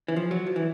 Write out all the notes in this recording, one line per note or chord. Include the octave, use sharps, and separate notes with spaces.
E3
F3
F#3
F3
E3